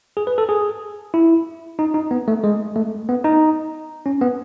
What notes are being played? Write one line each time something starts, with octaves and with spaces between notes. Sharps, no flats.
G#4
B4
A4
G#4
E4
D#4
D#4
B3
A3
G#3
A3
B3
D#4
C#4
B3